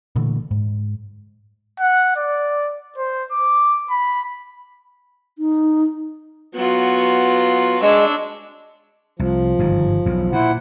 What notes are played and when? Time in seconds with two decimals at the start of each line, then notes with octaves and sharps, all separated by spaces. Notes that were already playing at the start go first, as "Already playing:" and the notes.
0.16 A#2 D3 E3 A3
0.51 G#2
1.80 F#5
2.16 D5
2.98 C5
3.32 D6
3.90 B5
5.38 D#4
6.55 F#3 B3 F4
7.82 G#3 D4 C#5 E6
9.19 C2 F3
9.59 G1 G#2 D#3
10.05 B1 E2
10.32 A#2 E4 C5 F#5